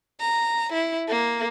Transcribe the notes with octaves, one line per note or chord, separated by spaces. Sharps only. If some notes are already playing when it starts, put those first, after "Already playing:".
A#5
E4
A#3